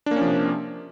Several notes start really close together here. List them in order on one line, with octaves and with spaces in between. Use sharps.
D4 A#3 C#4 F3 C3